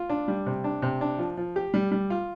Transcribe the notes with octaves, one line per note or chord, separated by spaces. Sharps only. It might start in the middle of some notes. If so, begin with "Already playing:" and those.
Already playing: F4
D4
G3
C3
D4
C3
D4
F3
F3
G4
G3
G3
F4